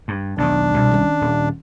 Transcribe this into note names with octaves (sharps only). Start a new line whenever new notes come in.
G2
B1 E2 D#3 D4
C2 B2
D#3 C#4
D#1